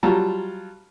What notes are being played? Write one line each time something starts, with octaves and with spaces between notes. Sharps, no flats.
F#3 G3 F4 A5 A#5